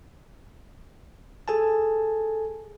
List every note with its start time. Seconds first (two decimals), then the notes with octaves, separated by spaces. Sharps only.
1.48 G#4 A4 G#5 A5